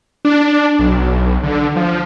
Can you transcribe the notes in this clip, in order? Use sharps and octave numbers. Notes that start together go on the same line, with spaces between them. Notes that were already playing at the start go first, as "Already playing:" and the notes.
D4
B1
D3
F3